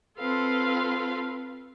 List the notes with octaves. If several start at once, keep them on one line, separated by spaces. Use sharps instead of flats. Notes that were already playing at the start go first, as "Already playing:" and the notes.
C4 F4 A4 B4 F5